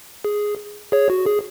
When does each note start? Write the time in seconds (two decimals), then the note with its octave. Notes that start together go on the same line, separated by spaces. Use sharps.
0.25 G#4
0.92 G#4 C#5
1.10 F#4
1.26 G#4